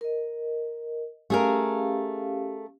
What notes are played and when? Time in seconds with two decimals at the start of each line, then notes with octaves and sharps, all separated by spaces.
0.01 A#4 D#5
1.30 A3 C#4 G4 G#4 A#4 F5